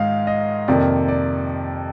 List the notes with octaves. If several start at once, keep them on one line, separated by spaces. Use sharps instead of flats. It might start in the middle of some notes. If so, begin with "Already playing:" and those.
Already playing: G#2 D#3 G#3 F5
D#5
F2 C3 D#3 A#3 D5
D5